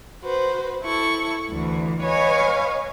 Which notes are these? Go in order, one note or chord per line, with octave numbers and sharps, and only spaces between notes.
F#4 B4 C5
E4 A4 C#6
D2 E3
B4 C#5 D#5 F5 G#5 C#6